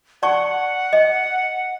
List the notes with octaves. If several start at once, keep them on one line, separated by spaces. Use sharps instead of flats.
D5 F#5 A5 C#6
D#5